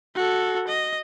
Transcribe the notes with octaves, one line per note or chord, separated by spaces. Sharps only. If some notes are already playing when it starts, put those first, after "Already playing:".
F#4 A4
D#5